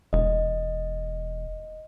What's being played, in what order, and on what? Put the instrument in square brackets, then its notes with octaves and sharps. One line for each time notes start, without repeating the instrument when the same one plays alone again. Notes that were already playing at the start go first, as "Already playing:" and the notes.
[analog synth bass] E1 [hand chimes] D#5